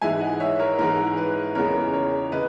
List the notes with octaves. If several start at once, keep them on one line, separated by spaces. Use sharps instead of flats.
G#2 E3 G#3 E5 G#5
D#5 F#5
C#5 E5
A#4 C#5
G#2 E3 G#3 A#4
B4
E2 C#3 E3 G#3 B3 A#4 C#5
A#4 C#5
C#3 B4 D#5